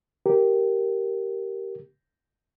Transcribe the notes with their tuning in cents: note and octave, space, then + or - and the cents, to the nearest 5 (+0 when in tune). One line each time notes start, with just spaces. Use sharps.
G4 -10 A#4 +0